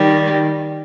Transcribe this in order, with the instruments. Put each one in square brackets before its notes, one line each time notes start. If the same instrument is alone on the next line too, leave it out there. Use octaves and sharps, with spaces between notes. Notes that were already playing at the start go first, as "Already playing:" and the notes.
Already playing: [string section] D#3 [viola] G3